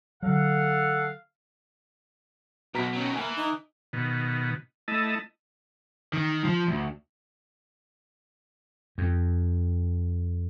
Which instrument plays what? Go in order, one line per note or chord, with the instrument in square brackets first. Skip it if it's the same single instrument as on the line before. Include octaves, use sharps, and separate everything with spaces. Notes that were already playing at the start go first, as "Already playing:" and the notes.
[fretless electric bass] D3 F#3 [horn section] A4 F5 F#5
[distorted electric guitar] B1 [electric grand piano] B2 A#5 B6
[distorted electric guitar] D#3 F#3 [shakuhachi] C#4
[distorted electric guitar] E3 [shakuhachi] A#3 [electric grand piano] G#5
[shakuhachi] D#4
[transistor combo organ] B2 D#3
A3 E4 D#5 A5
[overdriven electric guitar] D#3
F3
D2
[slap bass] F2